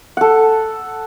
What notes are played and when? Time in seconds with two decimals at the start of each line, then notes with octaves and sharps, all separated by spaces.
0.17 A4 F#5